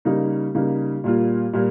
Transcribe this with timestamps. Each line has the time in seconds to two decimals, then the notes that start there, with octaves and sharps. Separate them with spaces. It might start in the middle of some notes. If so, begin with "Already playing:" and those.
0.05 C#3 G3 A#3 D#4
0.55 C#3 G3 A#3 D#4
1.04 A#2 G3 A#3 F4
1.53 A#2 G3 A#3